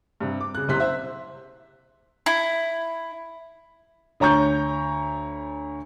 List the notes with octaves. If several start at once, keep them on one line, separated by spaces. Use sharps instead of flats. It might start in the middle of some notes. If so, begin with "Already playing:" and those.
G2 C3
D6
C#3 F#6
F#1 C2 C3 C6 F#6 B6
C5 E5
E4
D2 C#5 A#5 C#6 G6